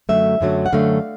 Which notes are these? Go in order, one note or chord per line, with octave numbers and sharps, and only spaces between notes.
F#2 D3 F#3 A3 E5
F#2 D3 F#3 A3
F#5
F#2 D3 F#3 A3 F5